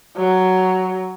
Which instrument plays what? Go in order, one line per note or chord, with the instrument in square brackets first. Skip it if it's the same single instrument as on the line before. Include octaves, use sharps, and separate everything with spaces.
[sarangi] F#3